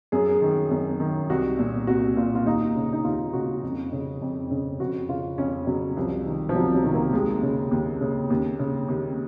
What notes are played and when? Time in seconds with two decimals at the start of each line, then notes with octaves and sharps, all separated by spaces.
0.12 F#2 G#4
0.29 G#4
0.42 D#3
0.71 F#2
1.00 D#3
1.30 C2 F#4
1.59 A#2
1.87 C2 F#4
2.17 A#2 F4
2.35 F4
2.45 D#2 D#4
2.76 C#3
2.93 D#4
3.04 D#2 F4
3.33 C#3 F#4
3.63 F2
3.93 C#3
4.21 F2
4.51 C#3
4.80 F2 F#4
5.09 C#3 F4
5.38 F2 C#4
5.67 C#3 F#3
5.97 C2 F3
6.25 C3 D#3
6.49 F3
6.55 C2 F#3
6.75 F#3
6.84 C3 D#3
6.94 A#3
7.13 D#2 G#3
7.43 C#3
7.71 D#2
8.01 C#3
8.30 D#2
8.59 C#3
8.88 D#2